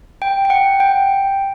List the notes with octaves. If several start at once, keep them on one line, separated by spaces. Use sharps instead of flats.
G5
G5
F#5
G5